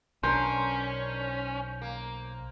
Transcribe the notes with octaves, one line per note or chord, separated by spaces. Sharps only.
B1 C#4 D4 A#4 C5
A#3